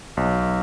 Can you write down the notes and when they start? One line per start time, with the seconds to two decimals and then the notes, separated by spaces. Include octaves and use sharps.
0.17 B1